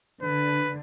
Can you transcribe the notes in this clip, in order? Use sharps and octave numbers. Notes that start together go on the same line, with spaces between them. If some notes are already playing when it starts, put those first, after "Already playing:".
D3 B4